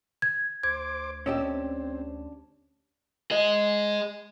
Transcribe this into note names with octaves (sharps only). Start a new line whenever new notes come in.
G#6
D2 C5 D6 G#6
A#2 C#4 D4 G4 D#5 E6
C4
G#4 D#5